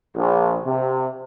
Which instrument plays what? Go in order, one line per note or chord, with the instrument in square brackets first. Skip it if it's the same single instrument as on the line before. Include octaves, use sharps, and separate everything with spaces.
[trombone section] A#1
C3